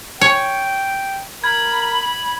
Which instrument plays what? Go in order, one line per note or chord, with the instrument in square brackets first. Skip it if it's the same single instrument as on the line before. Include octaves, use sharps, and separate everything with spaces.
[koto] C#5 [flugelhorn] G5
[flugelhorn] A#4 [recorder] B5 [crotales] G#6